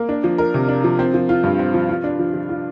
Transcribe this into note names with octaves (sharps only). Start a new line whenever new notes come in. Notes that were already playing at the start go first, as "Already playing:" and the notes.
Already playing: A#3
D4
F3
A#4
C3
D4
F3
C4
F3
F4
G2
C4
F3
F4
D4
F3
F3
F4